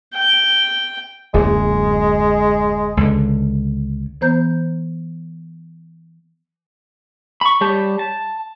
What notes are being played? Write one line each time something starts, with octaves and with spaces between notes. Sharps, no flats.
G5
D1 F#2 A#2 G#3
C#2 D3
E3 B3 C5 A#5 G6
B5 C#6
G3 G4 C#5 A5 G6
A5